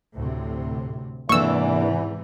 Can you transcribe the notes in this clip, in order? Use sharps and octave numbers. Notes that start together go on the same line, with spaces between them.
D2 A2 C3
E2 G#2 C3 E3 A#3 D4 C#6 E6